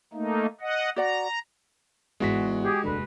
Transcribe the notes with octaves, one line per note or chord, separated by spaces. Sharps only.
A3 A#3 D#4
D#5 F#5
F#4 D5 F#5 A#5
G#1 E2 G#2 G#3 F#4 B6
G4 G#4
F1 D#2 D3 B4